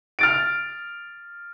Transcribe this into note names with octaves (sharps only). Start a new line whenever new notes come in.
F6 A6 D7